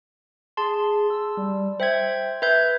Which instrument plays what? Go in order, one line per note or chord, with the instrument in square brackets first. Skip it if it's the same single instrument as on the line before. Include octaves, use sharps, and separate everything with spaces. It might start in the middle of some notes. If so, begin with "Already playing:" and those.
[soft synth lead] G#4 [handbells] A5 C6
[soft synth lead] E6
G3
[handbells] C5 E5 G#6 [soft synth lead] G5
[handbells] B4 E5 G6 [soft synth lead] G#6